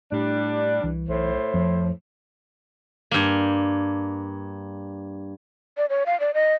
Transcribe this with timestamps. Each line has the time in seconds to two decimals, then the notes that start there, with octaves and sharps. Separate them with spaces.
0.12 A2 G3 D4
0.83 C2 E3
1.09 B1 A2 C5
1.54 F2 F3
3.11 G2 A#3
5.77 D5
5.90 C#5
6.06 F5
6.20 D5
6.34 D#5